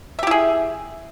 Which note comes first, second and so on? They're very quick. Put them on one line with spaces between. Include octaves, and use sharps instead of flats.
E5 G4 E4 G#4